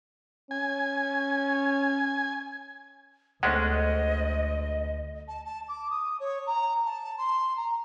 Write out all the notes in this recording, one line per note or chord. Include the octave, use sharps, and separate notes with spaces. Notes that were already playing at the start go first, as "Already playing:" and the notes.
C#4 G#5
D2 G#3 A3 C#4 D4 C5 D#5 F#5
A5
A5
D6
D#6
C#5
A#5
A5
C6
A#5